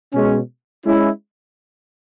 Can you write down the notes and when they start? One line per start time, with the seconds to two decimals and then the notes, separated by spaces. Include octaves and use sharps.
0.13 B2 G#3 C#4
0.84 G#3 C#4 E4